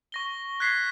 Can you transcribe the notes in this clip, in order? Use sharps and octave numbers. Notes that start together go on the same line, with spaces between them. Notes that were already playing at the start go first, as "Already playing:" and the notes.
C#6 A#6 G7
F#6 G#6 B6 C7